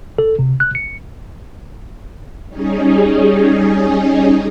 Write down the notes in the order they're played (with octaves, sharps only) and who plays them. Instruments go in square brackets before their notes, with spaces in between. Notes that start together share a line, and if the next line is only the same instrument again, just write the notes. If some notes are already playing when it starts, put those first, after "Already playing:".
[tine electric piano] A4
C3
F#6
C#7
[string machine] G3 C#4 D#4 G#4